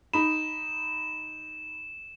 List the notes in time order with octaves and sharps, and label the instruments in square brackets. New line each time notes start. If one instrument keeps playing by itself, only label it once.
[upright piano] D#4 B5 [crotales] E7